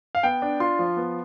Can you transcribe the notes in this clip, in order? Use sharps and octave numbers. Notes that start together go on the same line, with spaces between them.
F5
B3 G5
D4
F4 C6
F3
B3